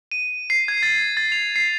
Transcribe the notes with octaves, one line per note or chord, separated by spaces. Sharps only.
D#7
C7
G#6
A6
A6
F7
C7